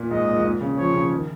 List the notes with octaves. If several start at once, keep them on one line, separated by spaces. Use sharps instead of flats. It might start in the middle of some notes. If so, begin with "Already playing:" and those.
Already playing: A#2
G#2 D#5
A#2
G#2
A#2
C#3
F3 C#5
C#3
D#3